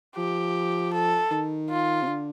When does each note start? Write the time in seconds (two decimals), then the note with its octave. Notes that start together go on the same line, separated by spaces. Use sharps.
0.16 F3 G4
0.93 A4
1.31 D#3
1.70 F4
2.02 C3
2.07 D3